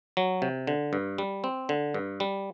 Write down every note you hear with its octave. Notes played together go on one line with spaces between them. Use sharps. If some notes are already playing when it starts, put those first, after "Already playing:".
F#3
C3
D3
G2
G3
C4
D3
G2
G3